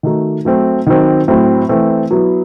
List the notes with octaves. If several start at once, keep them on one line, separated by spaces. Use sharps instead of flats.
D#3 A3 D#4 F#4
F#3 A3 C4
D#3 F#3 C4
A2 F#3 C4
E3 A3 C4
F#3 B3 E4